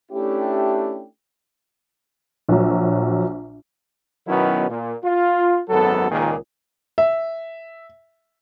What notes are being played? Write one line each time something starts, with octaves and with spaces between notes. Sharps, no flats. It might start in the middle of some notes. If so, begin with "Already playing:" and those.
A3 C#4 D4 E4 G4
A#1 F#3
B2 D#3 F#3 B3 C#4 E4
A#2
F4
G#1 F#2 F#3 B3 A4
C#2 A#2 D#3 A#3 G#4
E5